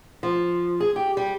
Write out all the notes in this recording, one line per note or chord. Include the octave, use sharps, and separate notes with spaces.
F3
G#4
G4
G3